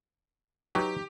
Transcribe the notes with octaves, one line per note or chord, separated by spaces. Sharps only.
F#3 D#4 G4 B4